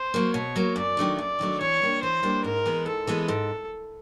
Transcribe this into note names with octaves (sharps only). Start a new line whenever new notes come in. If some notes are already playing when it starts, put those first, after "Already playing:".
Already playing: C5
F#3 A#3
B2 C#5
F#3 A#3
F#2 D5
D#3 F#3 A3 D4
F#2 D5
D#3 F#3 A3 D4
E3 C#5
G3 A#3 D4
E3 C5
G3 A#3 D4
G#2 A#4
E3 G#3 B3
G#2 A4
E3 G#3 B3
G#2 A4